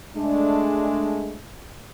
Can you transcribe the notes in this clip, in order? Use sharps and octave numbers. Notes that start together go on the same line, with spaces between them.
G#3 A3 D4